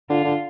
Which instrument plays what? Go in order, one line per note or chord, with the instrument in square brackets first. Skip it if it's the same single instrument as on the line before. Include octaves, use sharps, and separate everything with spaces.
[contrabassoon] D3 [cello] F4
[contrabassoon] D3